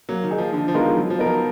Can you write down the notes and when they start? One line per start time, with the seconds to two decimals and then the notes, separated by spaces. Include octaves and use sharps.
0.09 F#3 A#3
0.23 D#3
0.31 D#4 G#4
0.38 F3
0.53 D3 F3
0.68 F3
0.74 D#3 G#3 B3 F4 A#4
0.96 F3 F#3
1.10 F3
1.19 B3 D#4 A#4
1.26 F3